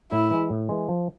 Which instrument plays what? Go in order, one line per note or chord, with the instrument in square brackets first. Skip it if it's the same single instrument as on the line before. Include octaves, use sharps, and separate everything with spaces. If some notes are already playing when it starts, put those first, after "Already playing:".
[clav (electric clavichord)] A2 [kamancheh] E4
[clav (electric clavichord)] E3 G#3
A2
E3 G#3
F3